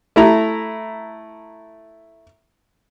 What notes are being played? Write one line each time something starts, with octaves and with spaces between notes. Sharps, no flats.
A3 E4 A#5